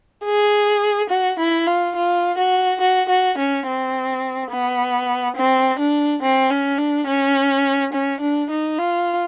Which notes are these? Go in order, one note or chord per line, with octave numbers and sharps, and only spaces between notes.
G#4
F#4
E4
F4
F4
F#4
F#4
F#4
C#4
C4
B3
C4
D4
C4
C#4
D4
C#4
C#4
D4
D#4
F4